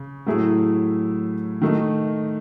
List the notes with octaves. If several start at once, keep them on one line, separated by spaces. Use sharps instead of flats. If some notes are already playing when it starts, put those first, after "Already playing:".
Already playing: C#3
A2 F#3 A3 E4 G#4
D#3 A3 D#4